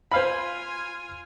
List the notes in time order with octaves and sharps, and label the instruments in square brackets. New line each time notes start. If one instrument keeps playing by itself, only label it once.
[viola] F4 G#5 [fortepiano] C5 F5 B5